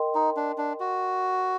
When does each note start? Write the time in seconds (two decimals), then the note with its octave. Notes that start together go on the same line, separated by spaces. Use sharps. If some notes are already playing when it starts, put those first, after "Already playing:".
Already playing: A#4 D#5 G5 C6
0.15 D#4
0.37 D4
0.58 D4
0.80 F#4